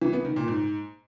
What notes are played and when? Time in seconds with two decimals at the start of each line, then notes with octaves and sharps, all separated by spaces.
0.02 E3
0.13 B3
0.25 D#3
0.36 A#2
0.48 G#2